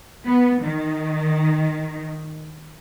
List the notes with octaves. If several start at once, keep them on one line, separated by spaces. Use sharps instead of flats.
B3
D#3